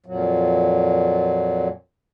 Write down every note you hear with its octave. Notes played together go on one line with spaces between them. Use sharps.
F2 A#2 F#3